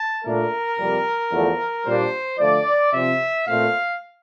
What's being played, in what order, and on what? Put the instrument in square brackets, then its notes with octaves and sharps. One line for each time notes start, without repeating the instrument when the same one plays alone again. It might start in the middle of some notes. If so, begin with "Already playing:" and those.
Already playing: [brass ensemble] A5
A#2 A3 D4 A#4
F2 C3 G3 A#3
E2 D3 F3 A3
A#2 G3 A#3 D4 C5
D3 F3 A3 D5
C3 F3 C4 E5
A#2 A3 C4 F5